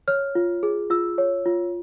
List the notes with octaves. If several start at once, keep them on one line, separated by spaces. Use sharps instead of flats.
C#5 F6
F4
G#4
F4 E6
C#5
F4